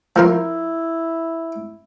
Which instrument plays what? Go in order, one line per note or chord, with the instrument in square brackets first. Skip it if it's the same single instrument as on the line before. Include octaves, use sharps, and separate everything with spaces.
[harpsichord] F3 A#4 C6 [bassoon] E4